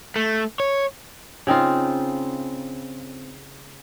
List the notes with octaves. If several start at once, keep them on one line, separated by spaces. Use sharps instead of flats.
A3
C#5
C#3 C4 D#4 F4